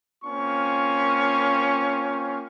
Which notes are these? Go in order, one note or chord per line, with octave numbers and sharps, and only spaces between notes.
A#3 C4 C#4 F4 C#6